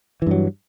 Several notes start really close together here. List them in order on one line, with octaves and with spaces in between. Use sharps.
E3 G2 F#3